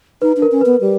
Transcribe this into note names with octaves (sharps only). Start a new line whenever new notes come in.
D#4 B4
D4
A#4
C#4
B3 B4
G3